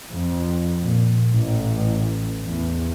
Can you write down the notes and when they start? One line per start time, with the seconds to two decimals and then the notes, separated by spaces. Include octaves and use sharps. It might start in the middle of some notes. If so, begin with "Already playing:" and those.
0.10 F2
0.81 A#2
1.29 A1
2.46 E2